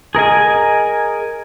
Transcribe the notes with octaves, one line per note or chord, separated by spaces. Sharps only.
G#4 A#4 D#5 G#5